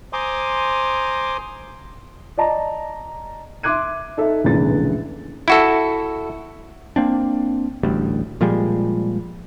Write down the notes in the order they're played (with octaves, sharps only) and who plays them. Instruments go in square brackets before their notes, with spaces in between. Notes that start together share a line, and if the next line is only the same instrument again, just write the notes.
[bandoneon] C5 G#5 A#5 C6 D6 D#6
[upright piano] D5 D#5 A5 A#5
E5 C6 D6 F#6 G#6 D#7
D#4 A4 E5
F1 C#2 A#2 D3 E3 A6
[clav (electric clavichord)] E4 F#4 A4
[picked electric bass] A#3 C4 D4
A1 D2 G3
A#2 F3 G3 G#3